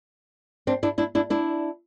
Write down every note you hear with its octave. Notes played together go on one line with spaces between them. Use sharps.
C4 D4
D4 E4
D4 E4
D4 E4
D4 E4